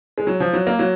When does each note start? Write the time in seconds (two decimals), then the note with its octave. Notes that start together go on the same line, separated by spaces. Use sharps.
0.18 G#3
0.27 F#3
0.40 F3
0.53 F#3
0.67 A#3
0.79 F#3